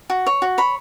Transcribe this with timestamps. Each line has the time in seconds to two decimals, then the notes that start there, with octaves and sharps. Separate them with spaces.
0.10 F#4
0.26 C#5
0.42 F#4
0.58 C#5 B5